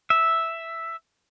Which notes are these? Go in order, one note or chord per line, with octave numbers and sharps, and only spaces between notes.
E5